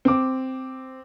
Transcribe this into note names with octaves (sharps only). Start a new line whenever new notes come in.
C4 D6